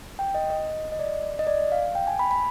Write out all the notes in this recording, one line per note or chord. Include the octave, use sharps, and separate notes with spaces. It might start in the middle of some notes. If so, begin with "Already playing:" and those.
G5
D#5
D#5
D#5
D5
D#5
D5
F5
G5
G#5
B5
B5